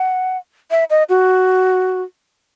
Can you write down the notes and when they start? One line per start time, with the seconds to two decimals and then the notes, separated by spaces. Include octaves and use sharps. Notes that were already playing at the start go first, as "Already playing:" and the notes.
Already playing: F#5
0.71 E5
0.90 D#5
1.09 F#4